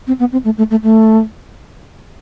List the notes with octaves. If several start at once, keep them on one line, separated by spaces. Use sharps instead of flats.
C4
B3
C4
A3
A3
A3
A3